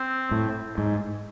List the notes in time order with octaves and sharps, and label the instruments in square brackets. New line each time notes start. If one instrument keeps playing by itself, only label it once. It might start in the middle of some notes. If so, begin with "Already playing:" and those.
Already playing: [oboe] C4
[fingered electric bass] A2
G#2